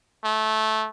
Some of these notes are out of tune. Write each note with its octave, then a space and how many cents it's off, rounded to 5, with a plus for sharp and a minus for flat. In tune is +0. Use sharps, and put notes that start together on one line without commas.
A3 -15